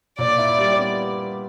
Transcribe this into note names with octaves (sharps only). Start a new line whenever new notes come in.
A#2 D5
E4
G3
B3